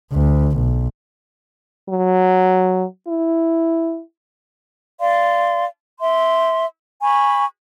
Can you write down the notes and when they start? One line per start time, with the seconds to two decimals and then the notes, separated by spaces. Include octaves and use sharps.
0.13 D2
0.57 B1
1.89 F#3
3.08 E4
4.99 D5 F5 C6
6.00 E5 C6
7.03 G#5 B5 C#6